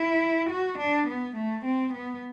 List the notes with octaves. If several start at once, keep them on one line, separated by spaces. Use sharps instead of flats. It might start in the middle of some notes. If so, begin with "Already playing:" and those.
Already playing: E4
F#4
D4
B3
A3
C4
B3